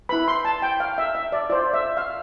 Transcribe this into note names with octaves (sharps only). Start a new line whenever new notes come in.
E4 B4 B5
C6
A5
G5
F5
E5
E5
D5
F4 C5 D5
E5
F5